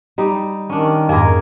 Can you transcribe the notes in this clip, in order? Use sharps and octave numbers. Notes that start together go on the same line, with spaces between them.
G3 D#4
D#3 C#4 D4
F2 G#2 A#3 G#4 A#4